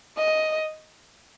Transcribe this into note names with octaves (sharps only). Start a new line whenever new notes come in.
D#5